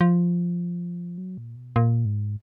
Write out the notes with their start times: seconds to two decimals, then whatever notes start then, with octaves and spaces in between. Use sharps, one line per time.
0.01 F3
1.18 F#3
1.37 A#2
1.56 B2
1.76 A#2
2.05 G#2